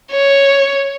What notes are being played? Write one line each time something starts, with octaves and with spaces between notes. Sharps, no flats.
C#5